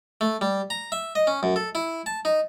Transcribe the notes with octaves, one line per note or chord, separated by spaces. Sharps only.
A3
G3
A#5
E5
D#5
C#4
F#2
A4
E4
A5
D#4